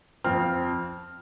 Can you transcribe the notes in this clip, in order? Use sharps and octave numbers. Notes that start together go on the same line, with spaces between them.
F2 F3 C4 F6